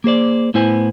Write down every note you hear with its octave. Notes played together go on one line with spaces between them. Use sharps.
A#3 G#4 C5 D5
A2 B3 E4 C5 G#5